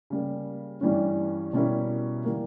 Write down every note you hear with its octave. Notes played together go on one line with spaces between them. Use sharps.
C#3 G3 A#3
G2 E3 G3 C#4
B2 G3 C#4 E4 A#4
E3 G3 A#3